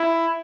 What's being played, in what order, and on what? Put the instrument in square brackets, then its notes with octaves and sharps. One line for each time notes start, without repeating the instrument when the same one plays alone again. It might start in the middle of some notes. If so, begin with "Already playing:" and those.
Already playing: [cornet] E4